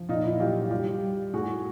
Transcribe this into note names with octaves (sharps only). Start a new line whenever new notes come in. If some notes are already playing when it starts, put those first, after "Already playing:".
Already playing: F3
A#2 D#4 F4
E4
F#3 F4 G4
G3 F4 G4
G3
A2 F#4 G#4